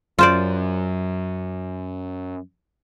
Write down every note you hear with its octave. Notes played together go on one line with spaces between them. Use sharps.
F#2 F4 C5 D5